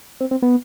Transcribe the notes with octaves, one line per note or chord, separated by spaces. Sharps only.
C4
C4
B3